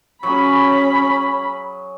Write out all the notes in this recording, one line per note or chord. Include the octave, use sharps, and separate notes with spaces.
F#3 C#4 G#4 B5